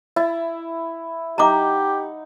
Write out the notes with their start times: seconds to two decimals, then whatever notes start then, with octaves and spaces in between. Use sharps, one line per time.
0.16 E4 D#5
1.38 D#4 G4 F#5 A#5 D6